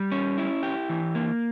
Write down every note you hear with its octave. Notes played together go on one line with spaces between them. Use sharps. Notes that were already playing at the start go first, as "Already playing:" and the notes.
Already playing: G3
C#4
E4
G4
E3
A#3